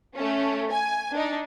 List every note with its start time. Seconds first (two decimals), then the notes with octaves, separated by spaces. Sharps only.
0.15 A3 C#4
0.71 G#5
1.12 D4 D#4